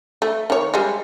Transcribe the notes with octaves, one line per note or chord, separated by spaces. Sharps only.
A3
D#3 C#5
G3 G#3